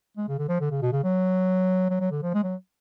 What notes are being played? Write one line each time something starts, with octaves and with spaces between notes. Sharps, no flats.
G#3
C#3
D3
F3
D3
C#3
B2
C#3
F#3
F#3
F#3
D3
F3
G#3
F#3